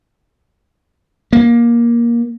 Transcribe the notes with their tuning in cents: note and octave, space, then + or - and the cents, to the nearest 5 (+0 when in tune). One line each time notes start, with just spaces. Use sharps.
A#3 +15